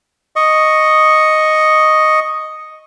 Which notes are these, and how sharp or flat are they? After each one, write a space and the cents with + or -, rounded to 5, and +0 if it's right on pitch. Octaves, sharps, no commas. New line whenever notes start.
D#5 +0 C#6 +0